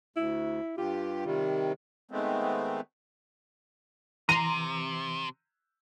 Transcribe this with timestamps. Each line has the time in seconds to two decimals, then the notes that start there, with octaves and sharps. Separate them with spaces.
0.16 D2 E4
0.78 G2 F4 G4
1.25 C3 D#3 G3
2.11 D#3 G#3 A3 B3 C4
4.29 C3 E3 A#5 C6 D#7